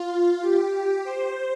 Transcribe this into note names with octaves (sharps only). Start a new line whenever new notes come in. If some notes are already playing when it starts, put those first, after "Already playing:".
Already playing: F4
G4
C5